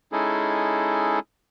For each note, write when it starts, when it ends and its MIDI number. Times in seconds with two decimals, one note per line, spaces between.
0.12 1.19 56
0.12 1.19 61
0.12 1.19 63
0.12 1.19 64
0.12 1.19 68
0.12 1.19 69